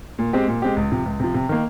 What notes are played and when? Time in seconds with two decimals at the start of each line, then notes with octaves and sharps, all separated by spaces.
0.19 A#2
0.33 G#3 C4 G4
0.48 A#2
0.62 G#3 C4 G4
0.77 C#2
0.91 C3 F3
1.06 C#2
1.20 C3 F3
1.34 C3
1.49 D#3 A#3